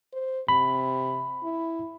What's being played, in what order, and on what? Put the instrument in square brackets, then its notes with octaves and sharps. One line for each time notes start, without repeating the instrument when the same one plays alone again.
[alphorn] C5
[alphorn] C3 [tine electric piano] B5
[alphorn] E4